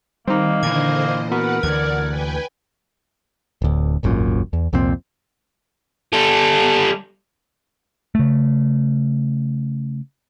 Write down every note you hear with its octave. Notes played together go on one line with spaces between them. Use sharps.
D#3 G3 A#3 C4 D#4
A#2 D3 E3 C5 D#5 G#6
B3 F#4 A#4 B4 F#5
D2 D3 E3 D5 F#5 G#6
B4 G5 G#5
D1 D2
D#1 G#1 F#2 A#2
E2
C2 F2 A#2 C4
G3 A4
C#3 A3